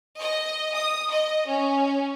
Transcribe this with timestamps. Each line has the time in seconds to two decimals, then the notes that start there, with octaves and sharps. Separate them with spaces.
0.19 D#5
0.74 D#6
1.11 D#5
1.47 C#4